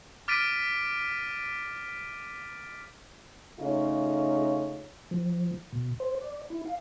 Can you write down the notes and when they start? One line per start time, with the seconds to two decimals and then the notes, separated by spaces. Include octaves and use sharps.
0.28 D6 F6 A6 B6 D7 D#7
3.59 C#3 A3 D#4 F4 C#5
5.11 F3
5.73 B2
6.00 C5
6.21 D5
6.50 E4
6.66 F5